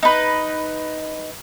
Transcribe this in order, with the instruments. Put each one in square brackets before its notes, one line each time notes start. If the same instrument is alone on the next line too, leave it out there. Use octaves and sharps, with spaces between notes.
[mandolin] D#4 B4